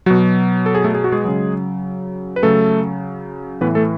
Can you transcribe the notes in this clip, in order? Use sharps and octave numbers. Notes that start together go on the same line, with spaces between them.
B2 F#3 F#4
A4
G#4
A3 A4
G#4
F#4
G#3 G#4
C#3 F#3
B4
C#3 F#3 A3 A4
A2 E3 B3 B4
A3 A4